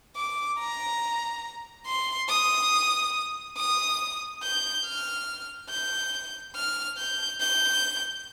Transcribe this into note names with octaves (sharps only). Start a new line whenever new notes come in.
D6
A#5
C6
D#6
D#6
G6
F6
G6
F6
G6
G6